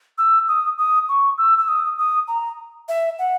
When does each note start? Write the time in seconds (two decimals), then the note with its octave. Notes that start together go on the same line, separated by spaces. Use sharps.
0.18 E6
0.48 D#6
0.78 D#6
1.09 C#6
1.38 E6
1.58 E6
1.68 D#6
1.98 D#6
2.28 A#5
2.89 E5
3.19 F#5